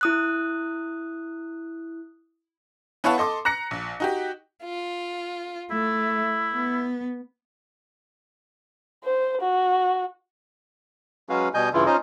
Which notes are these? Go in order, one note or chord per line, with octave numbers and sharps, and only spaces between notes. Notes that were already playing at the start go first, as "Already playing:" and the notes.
E4 D#6 F#6
B3 E4 C#5 F5 F#5 A5
A4 D#5 C6 D6
A#5 F#6 A#6 C#7
A#1
D#4 F#4 G4
F4
A3 E4
B3
C5
F#4
F#3 G#3 C#4 F#4 B4 F5
B2 G3 D#5 G#5 G6
G2 C#3 E3 E4 F4
C#4 D#4 F4 C5 D#5